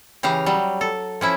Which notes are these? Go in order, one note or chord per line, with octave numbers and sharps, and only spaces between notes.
C#3 E3 G4 F5 A#5
F#3 G3
A4
F3 C#4 E4